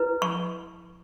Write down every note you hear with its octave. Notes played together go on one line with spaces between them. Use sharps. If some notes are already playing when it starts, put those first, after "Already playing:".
Already playing: E4 B4
C#6